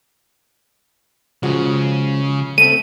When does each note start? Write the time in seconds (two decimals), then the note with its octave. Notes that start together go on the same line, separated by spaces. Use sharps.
1.43 C#3 F3 G#3 F#4
2.58 A3 C4 D#7